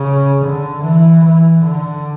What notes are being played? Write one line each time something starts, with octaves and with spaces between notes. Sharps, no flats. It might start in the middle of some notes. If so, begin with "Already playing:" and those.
Already playing: C#3
D3
E3
E3
D3